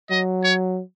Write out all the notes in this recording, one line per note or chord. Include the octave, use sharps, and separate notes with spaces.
F#3 D#5
C#5